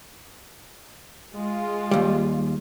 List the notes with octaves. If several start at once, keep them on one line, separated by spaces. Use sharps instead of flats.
G#3 F4
D#2 G3